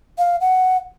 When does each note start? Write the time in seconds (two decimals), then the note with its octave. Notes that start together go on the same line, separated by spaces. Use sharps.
0.19 F5
0.41 F#5